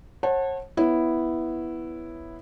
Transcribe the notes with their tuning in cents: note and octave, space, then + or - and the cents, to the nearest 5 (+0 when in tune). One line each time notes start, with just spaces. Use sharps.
C#5 -40 F#5 +0 A5 +0
B3 +0 E4 +0 C#5 +0